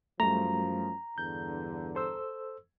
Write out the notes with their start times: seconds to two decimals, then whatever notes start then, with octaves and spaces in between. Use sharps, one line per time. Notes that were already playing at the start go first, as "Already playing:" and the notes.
0.20 F#2 F3 G3 A3 A#5
1.18 E2 G2 D3 G6
1.95 A4 C5 E6